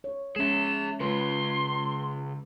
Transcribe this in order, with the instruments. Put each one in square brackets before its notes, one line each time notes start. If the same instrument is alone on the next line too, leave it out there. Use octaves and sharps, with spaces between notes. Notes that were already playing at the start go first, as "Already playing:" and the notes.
[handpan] C#5
[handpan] G#3 C#4 [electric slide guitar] G#4 E5 [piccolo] E7
[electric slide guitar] C#3 F4 [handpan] G#3 B4 [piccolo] C6